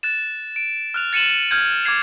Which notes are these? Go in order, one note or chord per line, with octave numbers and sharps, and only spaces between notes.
F#6 A6 E7
D7
F6 F#6 F7
A6 C#7 D#7 E7 F#7
F6 G6 G#6
D6 F6 G#6 C7 F7